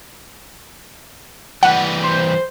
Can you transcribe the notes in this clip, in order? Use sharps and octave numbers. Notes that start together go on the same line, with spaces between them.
E3 G3 F#5
C5